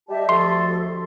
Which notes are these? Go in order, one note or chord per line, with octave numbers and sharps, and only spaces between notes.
G3 G4 D#5 E5 A5
D2 F3 A4 C6